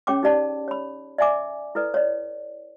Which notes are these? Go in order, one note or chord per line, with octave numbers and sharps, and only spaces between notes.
C#4 G#4 C#5 G5 C#6 D6
D#4 G4 D5 A5
C#5 B5
D5 E5 G#5 D6
E4 A4 B4 D5
C#5 D5